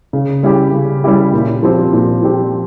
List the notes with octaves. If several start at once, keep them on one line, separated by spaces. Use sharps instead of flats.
C#3
G3 C#4 E4 G4
C#3
G3 C#4 E4 G4
A#2
F3 C4 G4
A#2
F3 C4 G4